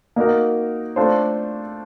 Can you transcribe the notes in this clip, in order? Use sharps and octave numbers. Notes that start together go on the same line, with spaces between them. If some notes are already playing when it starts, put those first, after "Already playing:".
A#3 D#4 F#4 A#4
A3 D4 F4 A4 C5